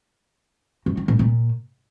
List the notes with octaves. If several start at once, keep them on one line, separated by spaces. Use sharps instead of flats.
F#2
D#3
A#2
A#2